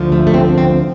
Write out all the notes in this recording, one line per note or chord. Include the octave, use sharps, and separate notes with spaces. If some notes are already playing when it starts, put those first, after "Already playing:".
Already playing: D2 D3 F3
A3
A3
C4
C4